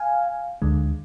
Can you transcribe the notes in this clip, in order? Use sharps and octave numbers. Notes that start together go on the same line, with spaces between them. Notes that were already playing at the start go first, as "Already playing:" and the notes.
Already playing: F5 G#5
D2 D3 G#3